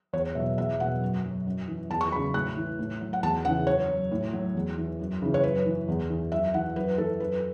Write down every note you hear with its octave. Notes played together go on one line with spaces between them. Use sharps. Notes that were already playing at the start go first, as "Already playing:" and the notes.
E2 C#5
B2 F#3 E5
E2 E5
B2 F#3 F#5
F#2
F#3
F#2
E3
E2 A5
C#6
C#3 F#3 B5
A2 F#6
E3
A2
F#3
F#5
E2 A5
C#3 E3 F#5
F#2 C#5
F#3
A2
F#3
E2
E3
F#2
C#3 E3
C#5
F#2 B4
E3
E2
E3
F#2 E5
E3 F#5
F#2 B4
E3 A4
F#2 B4